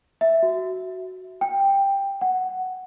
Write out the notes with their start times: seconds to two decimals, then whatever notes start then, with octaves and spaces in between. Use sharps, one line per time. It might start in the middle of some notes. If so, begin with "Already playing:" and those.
0.21 E5
0.43 F#4
1.41 G5
2.21 F#5